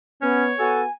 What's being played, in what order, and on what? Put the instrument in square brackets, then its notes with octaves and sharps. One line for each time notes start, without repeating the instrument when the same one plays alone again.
[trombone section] B3 [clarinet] C#4 [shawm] C#5
[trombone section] B3 F#4 [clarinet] A4 [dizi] G#5